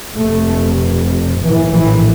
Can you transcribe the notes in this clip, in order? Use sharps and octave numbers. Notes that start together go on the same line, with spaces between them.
F1 F2 C3 A3
A#1 A2 E3
E3